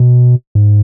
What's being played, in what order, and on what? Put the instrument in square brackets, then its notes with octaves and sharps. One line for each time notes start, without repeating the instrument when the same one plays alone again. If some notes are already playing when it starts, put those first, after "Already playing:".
Already playing: [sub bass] B2
G#2